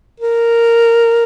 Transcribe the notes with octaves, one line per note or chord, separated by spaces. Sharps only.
A#4